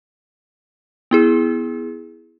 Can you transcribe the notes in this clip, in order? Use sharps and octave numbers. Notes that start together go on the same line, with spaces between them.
B3 E4 G#4